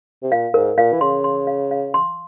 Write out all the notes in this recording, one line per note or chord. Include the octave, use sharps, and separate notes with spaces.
C3
A#2 F5
G#2 A#4
A#2 F5
E3
C#3 C6
C6
F5
F5
C6